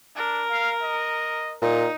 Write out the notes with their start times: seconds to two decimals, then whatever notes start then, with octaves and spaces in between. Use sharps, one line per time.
0.16 D4 A#4
0.50 F5
0.82 D#5
1.62 A#2 D#4